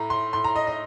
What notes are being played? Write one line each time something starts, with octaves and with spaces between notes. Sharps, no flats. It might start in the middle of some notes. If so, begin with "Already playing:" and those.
Already playing: A2 A#5
C6
A2 C6
A#5
D#5
D#5